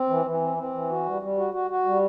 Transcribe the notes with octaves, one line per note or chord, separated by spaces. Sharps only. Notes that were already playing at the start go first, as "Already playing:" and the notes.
Already playing: C4
E3
E3
C4
C4
E3
F#4
G3
G3
F#4
F#4
F#4
G3